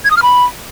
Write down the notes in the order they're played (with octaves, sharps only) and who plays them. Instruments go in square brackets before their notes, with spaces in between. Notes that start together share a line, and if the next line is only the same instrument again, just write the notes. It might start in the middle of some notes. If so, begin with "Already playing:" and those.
[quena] G#6
D#6
F6
B5